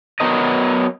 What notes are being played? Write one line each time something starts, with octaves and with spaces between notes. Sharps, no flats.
F#3 B3 A#4 D#5